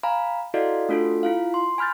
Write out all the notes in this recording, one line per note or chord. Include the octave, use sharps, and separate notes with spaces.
F5 G#5 A#5 B5
E4 F#4 A4 D5 D#5 F5
A3 D4 F4 F#4 A4
E4 F4 F5
C6
G#5 B5 F6 G6 A6